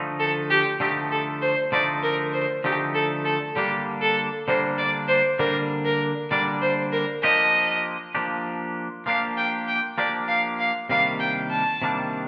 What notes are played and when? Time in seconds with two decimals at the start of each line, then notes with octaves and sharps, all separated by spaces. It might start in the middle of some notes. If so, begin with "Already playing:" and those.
Already playing: D3 F3 A3 D#4
0.20 A4
0.50 G4
0.80 D3 F3 A3 D#4 G4
1.12 A4
1.42 C5
1.72 D3 F3 A3 D#4 D5
2.03 A#4
2.33 C5
2.64 D3 F3 A3 D#4 G4
2.94 A4
3.25 A4
3.56 D3 G3 A#3 D4 G4
4.01 A4
4.48 D3 G3 A#3 D4 C5
4.78 D5
5.08 C5
5.39 D3 G3 A#3 D4 A#4
5.85 A#4
6.31 D3 G3 A#3 D4 D5
6.62 C5
6.93 A#4
7.23 F3 A#3 D4 G4 D#5
8.15 F3 A#3 D4 G4
9.06 F3 A#3 D4 G4 F5
9.37 G5
9.68 G5
9.98 F3 A#3 D4 G4 D5
10.28 F5
10.59 F5
10.89 C3 D#3 G3 A#3 D4 F5
11.20 G5
11.51 A5
11.82 C3 D#3 G3 A#3 D4